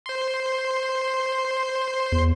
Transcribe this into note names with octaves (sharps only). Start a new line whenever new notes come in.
C5 C6
E2